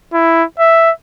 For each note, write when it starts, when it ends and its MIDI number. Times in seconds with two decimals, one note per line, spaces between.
0.13 0.44 64
0.60 0.91 76